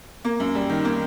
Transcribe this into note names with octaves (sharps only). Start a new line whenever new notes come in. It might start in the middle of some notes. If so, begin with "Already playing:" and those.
A#3
F#2
G3
D#3
A#3